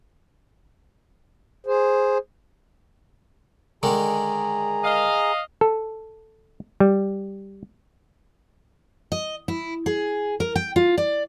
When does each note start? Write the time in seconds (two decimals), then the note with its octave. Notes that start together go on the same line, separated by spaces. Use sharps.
1.67 G#4 C5
3.83 D3 D#3 G#3 G#4 A#5
4.83 D#5 F5
5.61 A4
6.80 G3
9.12 D#5
9.48 E4
9.86 G#4
10.40 A#4
10.55 G5
10.76 F4
10.98 D5